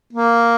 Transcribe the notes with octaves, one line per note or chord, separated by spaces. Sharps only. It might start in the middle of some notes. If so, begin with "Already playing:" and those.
A#3